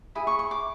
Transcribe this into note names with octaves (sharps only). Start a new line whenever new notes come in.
E4 G#4
C#6
C#6
D6